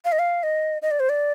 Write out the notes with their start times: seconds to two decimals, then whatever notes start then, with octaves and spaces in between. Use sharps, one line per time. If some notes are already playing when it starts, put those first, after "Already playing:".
0.05 F5
0.12 D#5
0.19 F5
0.43 D#5
0.82 D#5
0.91 D5
1.00 C5
1.09 D5